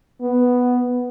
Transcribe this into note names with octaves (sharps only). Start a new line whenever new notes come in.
B3